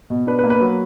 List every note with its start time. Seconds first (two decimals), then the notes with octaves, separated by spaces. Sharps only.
0.10 B2
0.27 D4 B4
0.39 B4
0.44 A#3
0.50 B4
0.61 F#3